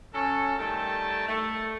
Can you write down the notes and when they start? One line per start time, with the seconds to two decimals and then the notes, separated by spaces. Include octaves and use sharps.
0.14 F#3 C#4 A4
0.58 D#3 G3 A3 G5 A5
1.28 A3